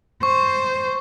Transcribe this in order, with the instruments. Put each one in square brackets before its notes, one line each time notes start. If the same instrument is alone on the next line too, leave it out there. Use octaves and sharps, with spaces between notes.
[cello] C5 [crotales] C#6